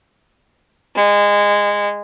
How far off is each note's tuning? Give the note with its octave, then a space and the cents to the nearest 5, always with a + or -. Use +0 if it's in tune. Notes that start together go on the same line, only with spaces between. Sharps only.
G#3 -20